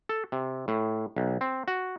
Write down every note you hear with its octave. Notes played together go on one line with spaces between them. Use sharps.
A4
C3
A2
B1
C4
F#4